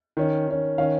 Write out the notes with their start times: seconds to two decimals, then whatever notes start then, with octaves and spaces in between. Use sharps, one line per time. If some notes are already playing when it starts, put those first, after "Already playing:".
0.17 D#3 C#4
0.48 D#3 C#4
0.78 D#3 C#4 F5